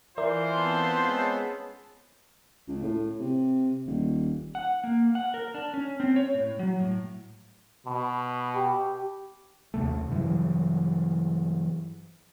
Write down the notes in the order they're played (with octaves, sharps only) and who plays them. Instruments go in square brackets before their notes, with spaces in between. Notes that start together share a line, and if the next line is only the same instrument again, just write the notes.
[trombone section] E3 [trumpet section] F4 C5 [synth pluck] A#4 D5 E5
[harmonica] B3 C4 A5
[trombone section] G#3 C#4
[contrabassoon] C#2
A2
C3
D#1
[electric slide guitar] F#5
A#3
F#5
A#4
D4
C#4
C4
C#5
A2
F#3
A2
[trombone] B2
[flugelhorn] G4
[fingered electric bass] D#2 C3 A3
G2 C#3 E3 F#3